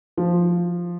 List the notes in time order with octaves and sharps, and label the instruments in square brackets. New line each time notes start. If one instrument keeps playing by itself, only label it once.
[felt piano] F3